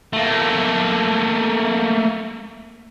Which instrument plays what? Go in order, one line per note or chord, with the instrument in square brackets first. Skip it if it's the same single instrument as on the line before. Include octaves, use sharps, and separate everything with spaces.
[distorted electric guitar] A3 A#3